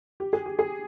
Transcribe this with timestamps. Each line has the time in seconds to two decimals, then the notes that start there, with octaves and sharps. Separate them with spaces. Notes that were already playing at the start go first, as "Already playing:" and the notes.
0.20 G4
0.33 G#4
0.46 G4
0.59 G#4